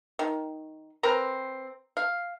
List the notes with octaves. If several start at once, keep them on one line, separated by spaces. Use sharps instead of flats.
D#3
C4 A#4 B4 A#5
F5